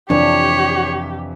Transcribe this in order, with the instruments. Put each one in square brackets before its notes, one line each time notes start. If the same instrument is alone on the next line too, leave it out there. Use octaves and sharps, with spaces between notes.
[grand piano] F2 C3 E3 [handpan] D4 [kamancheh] G4 [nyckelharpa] C#5